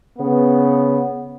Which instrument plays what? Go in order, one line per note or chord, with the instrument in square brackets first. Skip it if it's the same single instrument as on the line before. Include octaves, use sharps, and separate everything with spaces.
[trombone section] C#3 B3